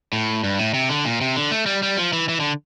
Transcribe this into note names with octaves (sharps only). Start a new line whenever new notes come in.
A2
G2
A2
C3
D3
A#2
C3
D3
A3
G3
G3
F3
E3
E3
D3